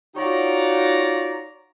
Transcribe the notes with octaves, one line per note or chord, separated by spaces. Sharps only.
D#4 F4 F#4 C#5 D5 A#5